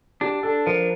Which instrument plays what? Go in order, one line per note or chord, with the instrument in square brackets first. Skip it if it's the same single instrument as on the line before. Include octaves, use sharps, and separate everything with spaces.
[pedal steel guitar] D4 [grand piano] G4
[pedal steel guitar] D4 [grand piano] A4
[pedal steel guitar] F3 [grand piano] A#4